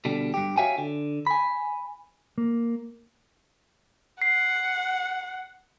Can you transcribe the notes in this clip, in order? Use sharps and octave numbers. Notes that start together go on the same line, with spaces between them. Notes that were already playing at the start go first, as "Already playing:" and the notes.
B2 D3 G3
G2 G4
F#4 C#5 E5 F5 G5 G#5
D3
G#5 B5
A#3
F#5 C7